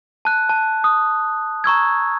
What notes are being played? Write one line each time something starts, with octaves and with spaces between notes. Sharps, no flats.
A5 F#6
A5
D#6
A#5 C#6 E6 G#6